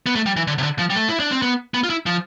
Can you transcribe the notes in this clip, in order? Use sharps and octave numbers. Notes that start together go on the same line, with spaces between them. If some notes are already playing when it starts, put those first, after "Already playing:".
B3
A3
G3
E3
D3
C3
D3
F3
G3
A3
E4
D4
C4
B3
B3
F4
E4
F3